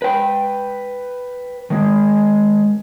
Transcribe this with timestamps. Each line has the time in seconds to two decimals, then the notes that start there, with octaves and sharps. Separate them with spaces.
0.02 B4 G5
1.70 D#3 G#3